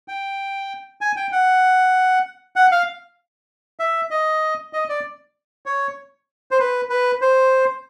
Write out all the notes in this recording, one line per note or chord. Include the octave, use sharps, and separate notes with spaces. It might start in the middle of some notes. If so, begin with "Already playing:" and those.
G5
G#5
G5
F#5
F#5
F5
E5
D#5
D#5
D5
C#5
C5
B4
B4
C5